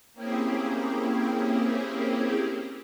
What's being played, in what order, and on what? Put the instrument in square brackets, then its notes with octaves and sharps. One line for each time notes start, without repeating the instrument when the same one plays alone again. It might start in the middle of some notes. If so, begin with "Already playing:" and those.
[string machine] A#3 C4 C#4 E4 G4 G#4